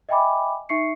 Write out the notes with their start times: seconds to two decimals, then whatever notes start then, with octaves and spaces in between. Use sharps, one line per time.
0.09 D#5 E5 G5 G#5 B5 D6
0.69 D#4 E5 C#6 C7 C#7